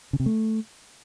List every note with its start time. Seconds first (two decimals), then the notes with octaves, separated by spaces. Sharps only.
0.13 C#3
0.20 C3
0.26 A3